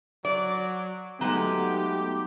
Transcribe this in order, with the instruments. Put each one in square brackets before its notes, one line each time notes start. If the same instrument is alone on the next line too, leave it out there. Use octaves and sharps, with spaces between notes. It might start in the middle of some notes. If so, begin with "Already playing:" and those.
[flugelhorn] F#3 [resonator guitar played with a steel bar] D5
[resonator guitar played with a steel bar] F#3 G#3 [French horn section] A3 B3 D#4 [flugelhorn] G4